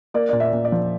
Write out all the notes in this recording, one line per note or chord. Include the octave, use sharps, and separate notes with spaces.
A#3 D5
A#2 D5
E5
A#2
D5
F3